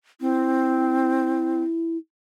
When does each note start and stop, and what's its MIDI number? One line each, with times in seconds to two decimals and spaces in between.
0.21 1.62 60
0.21 1.97 64